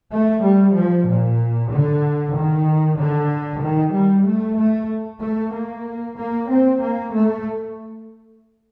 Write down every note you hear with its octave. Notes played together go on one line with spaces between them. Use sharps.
A3
G3
F3
A#2
D3
D#3
D3
D#3
G3
A3
A3
A3
A#3
A#3
C4
A#3
A3